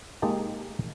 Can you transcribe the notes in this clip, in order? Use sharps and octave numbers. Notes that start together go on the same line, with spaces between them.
G#3 A#3 D#4 G4 A5